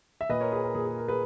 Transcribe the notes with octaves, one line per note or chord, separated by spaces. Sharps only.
E5
A#2 B4 D#5
A#4 C#5
G#4 B4
A#4
A#2 G#4
G#4
A#4
G#4 B4